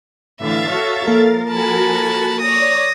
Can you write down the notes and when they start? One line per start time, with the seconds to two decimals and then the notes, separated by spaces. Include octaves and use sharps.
0.41 A2 D3 E3 E5 F5 A6
0.71 F#4 A4 C#5
1.07 F3 A#3 A4 A#4
1.50 F#4 G#5 A5 B5
2.40 C#5 D5 D#6 A#6